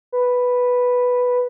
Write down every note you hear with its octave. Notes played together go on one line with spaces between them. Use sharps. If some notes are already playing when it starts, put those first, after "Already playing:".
B4